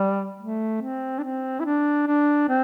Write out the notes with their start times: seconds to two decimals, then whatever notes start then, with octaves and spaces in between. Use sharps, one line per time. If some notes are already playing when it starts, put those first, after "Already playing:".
Already playing: G3
0.40 A3
0.81 C4
1.18 D4
1.23 C4
1.60 E4
1.65 D4
2.07 D4
2.49 C4